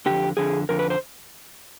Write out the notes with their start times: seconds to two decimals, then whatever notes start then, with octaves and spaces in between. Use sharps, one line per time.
0.06 F2 D3 G4
0.37 F2 D3 G#4
0.69 F2 D3 A#4
0.79 B4
0.90 C5